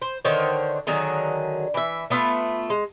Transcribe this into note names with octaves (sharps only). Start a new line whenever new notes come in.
C5
D3 D#3 C5 C#5
D3 D#3 F#3 G#4
E3 E5
A3 B3 F4 E5
G#3